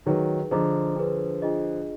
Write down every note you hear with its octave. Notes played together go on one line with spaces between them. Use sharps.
D#3 F#3 D#4 G#4 B4
D3 F3 G#4 D#5 A#5 D6
D4 G#4 B4
D4 F4 G#4 D#5